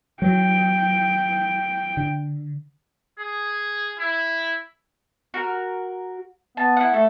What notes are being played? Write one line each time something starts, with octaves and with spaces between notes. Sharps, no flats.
F#3 G5
D3
G#4
E4
F#4 A#4
B3 A5
E4 F#5
A3 A4